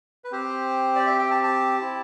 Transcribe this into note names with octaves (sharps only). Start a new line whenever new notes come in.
B4
C4 G4 C5
D5
E5
G5
A5
A5
C4 E4 G4